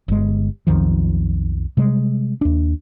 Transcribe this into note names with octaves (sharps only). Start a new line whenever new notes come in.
G1 G#3
B1 F2 D#3 F3
C3 G3 G#3
D#2 D4